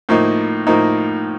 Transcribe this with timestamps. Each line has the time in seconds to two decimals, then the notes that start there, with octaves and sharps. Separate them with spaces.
0.09 A2 F3 A#3 D#4
0.67 A2 F3 A#3 D#4